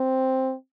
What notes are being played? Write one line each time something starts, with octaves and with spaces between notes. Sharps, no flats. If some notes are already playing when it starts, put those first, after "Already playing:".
Already playing: C4